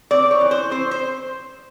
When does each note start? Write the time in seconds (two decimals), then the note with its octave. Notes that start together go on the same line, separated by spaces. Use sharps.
0.11 C4 D5
0.31 C#5
0.41 E3
0.51 C5
0.71 C4 C5
0.91 C5